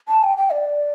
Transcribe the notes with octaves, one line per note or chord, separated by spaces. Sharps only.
A5
G5
G5
D5